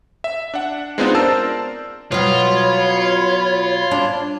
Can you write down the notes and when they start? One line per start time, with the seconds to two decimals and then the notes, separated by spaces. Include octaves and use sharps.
0.24 E5
0.54 D4 F#5
0.98 G#3 B3 C4 D4 D#4 F4
1.15 A#4 C5 D5 A5 E6
2.12 B2 F#3 F4 C#5 B5
3.91 D4